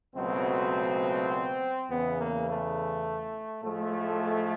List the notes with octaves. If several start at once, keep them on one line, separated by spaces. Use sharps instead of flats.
C#2 B2 F#3 A3 C4
E2 C#3 E3 B3
A#3
A3
A2 F3 G#3 A3